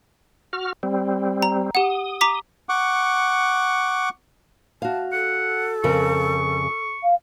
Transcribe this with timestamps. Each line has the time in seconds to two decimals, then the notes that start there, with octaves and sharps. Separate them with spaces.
0.53 F#4 F6
0.83 G3 C4
1.42 A#5
1.75 G4 F#5 D#6
2.21 A#5 D6 B6
2.69 F#5 C#6 D6
4.82 F#4 F5 A5
5.13 A4 F#5
5.84 F2 C#3 A#4 C#6
7.03 F5